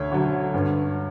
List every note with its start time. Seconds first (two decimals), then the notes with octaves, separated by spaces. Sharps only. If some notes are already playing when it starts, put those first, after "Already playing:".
Already playing: D2 C#5
0.12 D3 F#3
0.54 G2